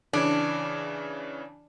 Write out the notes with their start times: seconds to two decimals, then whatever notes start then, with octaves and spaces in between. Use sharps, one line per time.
0.13 C#3 E3 D4 C#5